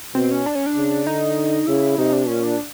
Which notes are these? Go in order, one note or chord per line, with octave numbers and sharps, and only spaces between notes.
B2 C4
C#4
D4
C#4
D4
C#3
D3 D#4
C#3 E4
C3 D#4
D4
A#2 C#4
D4